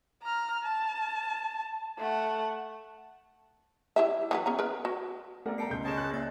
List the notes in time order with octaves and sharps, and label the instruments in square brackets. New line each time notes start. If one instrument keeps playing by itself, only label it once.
[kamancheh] A#5 F6
A5
A3 F#5
[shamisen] E4 G4 E5
E3 F#3 B4
B3 C#4 A#5
A#4 B4
F#4
[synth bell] A3 B3 [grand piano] A#4 D5 F#5
[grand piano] G3 [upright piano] A#4 A5 A#5 [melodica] G5 [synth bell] C7 C#7
[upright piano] C#2 C6 G6
[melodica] G#3 C#4 A5 [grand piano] D#6 G#6 E7
[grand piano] F#6
[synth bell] A#3 A6 [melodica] E4 [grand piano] D5